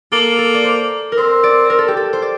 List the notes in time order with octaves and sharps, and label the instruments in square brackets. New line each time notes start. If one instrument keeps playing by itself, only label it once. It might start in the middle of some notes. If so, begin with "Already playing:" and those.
[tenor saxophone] A#3 [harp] A4
[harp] A4
D5
C5
A#4
[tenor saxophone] C4 [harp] C5
[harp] D5
A#4
A4
G4
A4
C5
D5